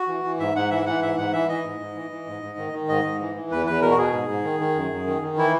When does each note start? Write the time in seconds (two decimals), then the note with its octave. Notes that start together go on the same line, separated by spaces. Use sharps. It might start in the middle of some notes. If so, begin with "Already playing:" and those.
Already playing: F#4
0.08 E3
0.24 E3
0.39 G#2 E5
0.55 G#2 F#5
0.71 E3 E5
0.86 E3 F#5
1.02 G#2 E5
1.17 G#2 F#5
1.33 E3 E5
1.49 E3 D#5
1.64 G#2
1.80 G#2
1.95 E3
2.11 E3
2.27 G#2
2.42 G#2
2.58 D#3
2.73 D#3
2.89 G#2 D#5
3.05 G#2
3.20 E3
3.35 E3
3.51 E2 B4
3.66 E2 B4
3.82 B2 A#4
3.91 F#4
3.98 B2 G#4
4.13 G#2
4.28 G#2
4.44 D#3
4.60 D#3
4.75 F#2
4.91 F#2
5.07 D#3
5.22 D#3
5.37 E3 E4